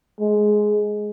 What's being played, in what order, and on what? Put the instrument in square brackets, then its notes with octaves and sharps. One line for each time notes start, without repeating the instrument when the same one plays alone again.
[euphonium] G#3